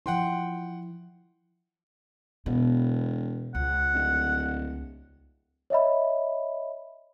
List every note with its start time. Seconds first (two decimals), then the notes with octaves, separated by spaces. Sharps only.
0.06 F3 E4 F#5 G5 C6
2.46 E1 B2
3.55 C#2 F#5
3.94 D1
5.70 C#5 D#5 E5 B5